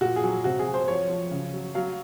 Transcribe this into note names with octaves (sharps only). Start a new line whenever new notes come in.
A#2 F#4
G#4
F#3
C3 F#4
G#4
F#3
C5
F3 C#5
F3
C#3
F#3
F#3 F5